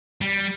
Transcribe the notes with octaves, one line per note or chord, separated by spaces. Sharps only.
G3